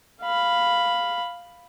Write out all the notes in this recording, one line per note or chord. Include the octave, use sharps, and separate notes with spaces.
F5 B5